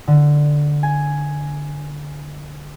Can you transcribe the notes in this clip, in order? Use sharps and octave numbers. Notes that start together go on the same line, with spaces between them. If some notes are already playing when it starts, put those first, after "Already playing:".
D3
G#5